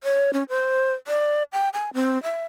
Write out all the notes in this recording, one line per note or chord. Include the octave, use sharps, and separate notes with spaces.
C#5
C#4
C5
D5
G5
G#5
C4
E5